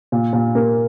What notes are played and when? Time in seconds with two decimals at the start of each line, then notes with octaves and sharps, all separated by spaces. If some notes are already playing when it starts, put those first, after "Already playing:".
0.12 A#2
0.33 A#2
0.55 A#3